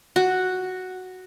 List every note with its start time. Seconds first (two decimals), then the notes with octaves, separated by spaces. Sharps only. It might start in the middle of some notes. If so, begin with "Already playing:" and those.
0.16 F#4